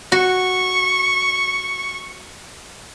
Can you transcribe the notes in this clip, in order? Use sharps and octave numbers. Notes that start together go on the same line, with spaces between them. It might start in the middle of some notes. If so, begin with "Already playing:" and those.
F#4 C#6